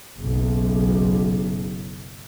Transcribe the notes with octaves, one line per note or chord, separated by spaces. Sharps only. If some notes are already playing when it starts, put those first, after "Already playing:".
F#1 B1